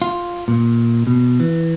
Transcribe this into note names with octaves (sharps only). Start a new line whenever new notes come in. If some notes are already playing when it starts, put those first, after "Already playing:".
F4
A#2
B2
E3